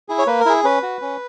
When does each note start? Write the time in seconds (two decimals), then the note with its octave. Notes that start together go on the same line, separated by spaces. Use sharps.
0.09 E4 G#4
0.19 C#5
0.27 A#3 B4
0.40 A#4
0.46 E4 G#4
0.64 C#4 B4
0.82 F#4
1.02 C#4